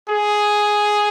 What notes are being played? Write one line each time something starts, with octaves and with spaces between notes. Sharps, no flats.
G#4